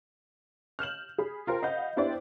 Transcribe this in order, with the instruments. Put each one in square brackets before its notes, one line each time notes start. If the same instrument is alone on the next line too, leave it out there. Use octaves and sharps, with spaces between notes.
[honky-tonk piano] F6 G6 E7 F#7
G#4 B5
F4 A#4 C5 G5
D#5 F5 F#5 B5 G6
B3 D4 E4 G4 C5 D5